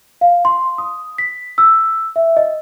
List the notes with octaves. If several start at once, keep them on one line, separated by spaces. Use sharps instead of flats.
F5
C6
D#6
B6
E6
E5
D#5